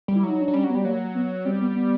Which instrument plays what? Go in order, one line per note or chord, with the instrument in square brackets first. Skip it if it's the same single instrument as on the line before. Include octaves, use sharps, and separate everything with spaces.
[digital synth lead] G3
[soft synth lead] E4
[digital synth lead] F#3
[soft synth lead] D#4
D4
[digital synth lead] F#3
[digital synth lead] G3 [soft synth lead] C#4
[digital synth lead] F#3
[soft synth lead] B3
[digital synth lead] G3
[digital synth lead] F#3 [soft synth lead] A#3
[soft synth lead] B3
[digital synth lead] G3 [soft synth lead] C4
[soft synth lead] B3
B3